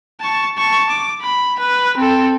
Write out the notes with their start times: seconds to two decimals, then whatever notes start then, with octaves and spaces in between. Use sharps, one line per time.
0.20 A5 C#6
0.58 A5 C#6
0.90 D6
1.23 B5
1.59 B4
1.97 C4 A4